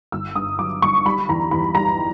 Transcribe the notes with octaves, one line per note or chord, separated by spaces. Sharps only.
G1 E6
G2 D#6
F#3 D6
G1 C#6
G3 B5
E2 A#5
E2 B5
G3 A#5